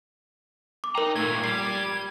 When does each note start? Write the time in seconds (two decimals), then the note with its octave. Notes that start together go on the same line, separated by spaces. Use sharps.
0.84 D6
0.95 D#4 A#4 G5 A#5
1.16 A#2 A3 G#6
1.44 G3 G4 C7